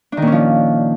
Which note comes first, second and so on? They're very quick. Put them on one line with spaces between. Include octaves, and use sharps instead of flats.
D4 D#3 A#2 C#4 F3